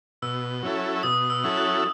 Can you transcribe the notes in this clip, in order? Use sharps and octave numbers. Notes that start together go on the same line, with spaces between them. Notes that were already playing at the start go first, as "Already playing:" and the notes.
B2 E6
F#3 C#4 E4 A4
B2 D#6
E6
F#3 C#4 E4 A4
F#6